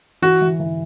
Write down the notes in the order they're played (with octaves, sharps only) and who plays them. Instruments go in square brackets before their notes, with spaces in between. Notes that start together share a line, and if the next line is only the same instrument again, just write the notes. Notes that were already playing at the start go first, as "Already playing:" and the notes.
[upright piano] E3 [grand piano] F#4
[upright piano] E3
E3